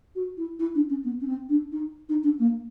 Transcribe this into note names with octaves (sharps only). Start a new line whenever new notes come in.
F#4
E4
E4
D4
C#4
B3
C#4
C4
D4
D#4
D#4
D4
A#3